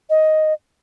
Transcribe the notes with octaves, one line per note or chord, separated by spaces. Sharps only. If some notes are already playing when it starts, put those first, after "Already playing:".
D#5